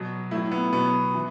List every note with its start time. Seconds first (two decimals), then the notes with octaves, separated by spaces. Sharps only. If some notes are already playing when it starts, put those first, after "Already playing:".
Already playing: B2 F#3
0.31 A2 F#3 E4
0.52 B3
0.73 B2 F#3 B3
1.14 E3